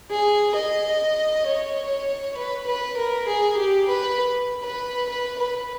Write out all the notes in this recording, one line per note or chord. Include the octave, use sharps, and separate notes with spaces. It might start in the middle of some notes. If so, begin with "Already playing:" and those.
G#4
D#5
C#5
B4
B4
A#4
G#4
G4
B4
B4
B4
B4